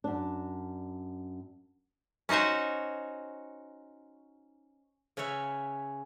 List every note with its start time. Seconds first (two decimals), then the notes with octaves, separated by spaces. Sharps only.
0.04 F#2 D4
2.29 C#4 D#4 F#4 C5 C#5
5.17 C#3 C#4 B4 C#5 E5